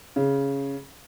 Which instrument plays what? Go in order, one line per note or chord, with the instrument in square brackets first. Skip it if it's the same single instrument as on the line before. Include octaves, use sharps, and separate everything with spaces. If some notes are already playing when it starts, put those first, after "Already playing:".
[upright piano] C#3